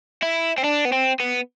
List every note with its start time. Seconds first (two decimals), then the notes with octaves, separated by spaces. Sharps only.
0.23 E4
0.58 C4
0.64 D4
0.85 B3
0.92 C4
1.20 B3